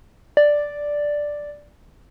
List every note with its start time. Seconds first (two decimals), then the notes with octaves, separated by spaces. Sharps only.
0.37 D5